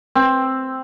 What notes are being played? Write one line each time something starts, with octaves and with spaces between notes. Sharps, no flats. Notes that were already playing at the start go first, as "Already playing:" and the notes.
C4